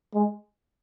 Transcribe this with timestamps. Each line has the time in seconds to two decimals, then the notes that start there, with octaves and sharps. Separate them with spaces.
0.15 G#3